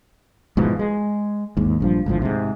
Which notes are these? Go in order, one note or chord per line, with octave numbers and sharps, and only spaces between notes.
G#2 B2 E3 F3
G#3
D#2 G#2
A#1 G2 F3
G#1 D2 A2 F3
G#2 C3